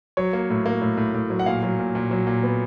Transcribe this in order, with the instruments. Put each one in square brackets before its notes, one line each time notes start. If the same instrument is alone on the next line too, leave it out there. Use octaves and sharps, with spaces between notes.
[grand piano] F#3 C#5
A#3
A2
A#3
A2
A2
A2
F#3
F#5
A#2 F5
F#3
A#2
A#2
F#3
A#2
B3